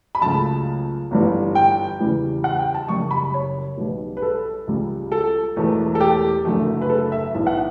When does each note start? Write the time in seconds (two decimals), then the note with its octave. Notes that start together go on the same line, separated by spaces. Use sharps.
0.15 B5
0.21 C#2 C#3 F#3 A3 A5
1.11 G1 G2 E3 G3
1.55 G5
2.00 E2 C#3 E3 G3
2.44 F#5
2.59 G5
2.74 A5
2.88 F#1 F#2 C#3 G3 C#6
3.11 B5
3.34 C#5
3.78 B1 B2 G3
4.17 B4
4.22 A4
4.68 C#2 C#3 G3
5.12 A4
5.56 E1 E2 B2 A3
5.95 A4
6.00 G4
6.45 F#1 F#2 D3 F#3 A3
6.82 B4
6.89 A4
7.12 E5
7.35 B1 A2 E3 E5
7.47 F#5